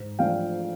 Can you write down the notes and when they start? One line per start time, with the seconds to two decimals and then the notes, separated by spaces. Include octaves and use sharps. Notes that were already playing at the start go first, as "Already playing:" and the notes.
Already playing: G#2
0.19 F3 A3 D4 F4 F5 G5